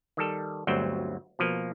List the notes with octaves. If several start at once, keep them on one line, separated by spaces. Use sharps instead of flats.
D#3 G3 A4
G1 D2 F#3 C4 G5
B2 F3 A#3